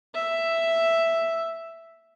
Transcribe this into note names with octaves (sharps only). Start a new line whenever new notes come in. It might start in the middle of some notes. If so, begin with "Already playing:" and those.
E5